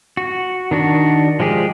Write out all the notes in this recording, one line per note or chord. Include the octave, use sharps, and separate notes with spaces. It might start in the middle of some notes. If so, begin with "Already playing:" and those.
F#4
D#3 D4 F#4
F3 G#3 G4 G#4